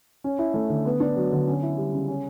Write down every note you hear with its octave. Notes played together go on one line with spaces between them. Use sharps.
C#4
E4
A3
D3
B3
D4
F#3
D3
C#4
E4
G3
C#3
C#4